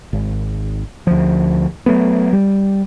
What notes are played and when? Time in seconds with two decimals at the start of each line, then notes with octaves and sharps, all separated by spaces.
0.13 G#1
1.07 D2 F3
1.86 F#3 A3 B3
2.33 G3